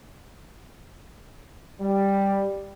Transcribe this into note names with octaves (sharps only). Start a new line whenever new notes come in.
G3